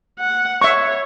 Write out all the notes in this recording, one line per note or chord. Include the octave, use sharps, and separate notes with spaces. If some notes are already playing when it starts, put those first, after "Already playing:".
F#5
C#5 E5 C#6